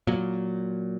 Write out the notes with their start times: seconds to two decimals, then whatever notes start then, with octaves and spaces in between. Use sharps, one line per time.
0.07 A#2 F#3